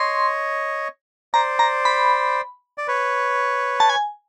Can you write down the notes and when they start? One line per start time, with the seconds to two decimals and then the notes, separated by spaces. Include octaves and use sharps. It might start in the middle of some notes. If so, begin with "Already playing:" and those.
Already playing: C#5 D#5 C6
1.34 C5 D5 A#5
1.59 A#5
1.85 B5
2.78 D5
2.88 B4 C#5
3.80 A5
3.89 G#5